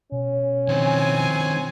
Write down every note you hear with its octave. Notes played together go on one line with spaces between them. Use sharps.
B2 C#4
D#3 F3 C4 C#5 G#5